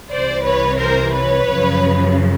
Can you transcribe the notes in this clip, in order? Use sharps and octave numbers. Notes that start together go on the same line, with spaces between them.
C2 C3 E3 C5 D5
B4 C#5
A#4 C5
B4 C#5
F#2 C#3 F3